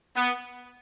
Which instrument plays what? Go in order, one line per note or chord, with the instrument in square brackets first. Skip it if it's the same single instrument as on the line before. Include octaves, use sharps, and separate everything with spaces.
[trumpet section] B3